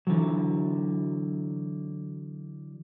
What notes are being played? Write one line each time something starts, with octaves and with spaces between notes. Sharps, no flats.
D3 E3 F#3